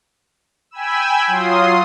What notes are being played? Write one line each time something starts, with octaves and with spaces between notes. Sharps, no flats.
G5 G#5 B5 E6
F#3 F4 C6 D#6